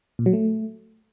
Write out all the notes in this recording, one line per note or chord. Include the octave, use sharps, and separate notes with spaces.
A#2
F#3
A3